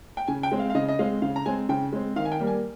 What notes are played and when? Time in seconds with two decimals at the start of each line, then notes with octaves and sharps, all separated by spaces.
0.17 G5
0.28 C#3 G#5
0.43 G5
0.52 G#3 C4
0.59 F5
0.70 F5
0.75 C#3 D#5
0.89 D#5
0.99 G#3 C4 F5
1.22 C#3 F5
1.36 A#5
1.46 G#3 C4 G#5
1.69 C#3 G5
1.93 G#3 C4
2.16 D#3 F5
2.25 G#5
2.32 G5
2.40 G3 A#3
2.47 G#5